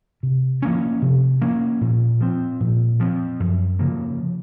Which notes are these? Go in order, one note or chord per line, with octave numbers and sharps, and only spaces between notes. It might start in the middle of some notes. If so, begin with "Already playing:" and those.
C3
F3 A#3 C#4
C3
F3 A#3 C#4
A#2
F3 C4
A#2
F3 C4
F#2
C#3 F3 A#3